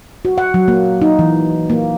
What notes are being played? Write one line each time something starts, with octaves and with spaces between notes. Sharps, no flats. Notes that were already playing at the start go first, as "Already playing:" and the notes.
F#4
F#5
F#3
A#3
D#4
E3
A#3